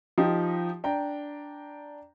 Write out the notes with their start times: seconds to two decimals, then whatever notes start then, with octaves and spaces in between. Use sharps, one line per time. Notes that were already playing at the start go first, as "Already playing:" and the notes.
0.18 F3 D#4 G4
0.84 D4 G5 A#5